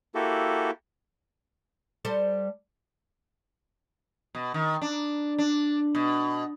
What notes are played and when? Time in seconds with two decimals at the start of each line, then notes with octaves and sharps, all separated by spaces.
0.15 A#3 E4 F#4 G4 A4
2.05 G3 A4 C5
4.35 B2
4.54 D#3
4.82 D4
5.39 D4
5.95 B2